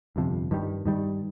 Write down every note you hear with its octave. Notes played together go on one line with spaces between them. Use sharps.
G1 F2 C3 F3
G2 D#3 G3
G2 D#3 G3